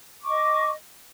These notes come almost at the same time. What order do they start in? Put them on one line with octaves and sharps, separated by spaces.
D6 C#6 D#5